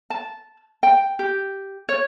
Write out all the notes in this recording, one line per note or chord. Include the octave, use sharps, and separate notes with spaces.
A5
G5
G4
C#5